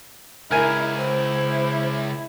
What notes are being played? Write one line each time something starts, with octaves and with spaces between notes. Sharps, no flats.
C#2 E4 A#4 G#5
E4 C5